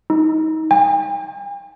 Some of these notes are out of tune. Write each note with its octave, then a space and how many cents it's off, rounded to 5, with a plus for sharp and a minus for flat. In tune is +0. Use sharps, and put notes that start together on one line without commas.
D#4 +25
G5 +45